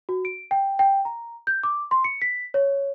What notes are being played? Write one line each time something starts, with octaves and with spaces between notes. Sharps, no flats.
F#4
D7
G5
G5
A#5
G6
D6
C6
C#7
B6
C#5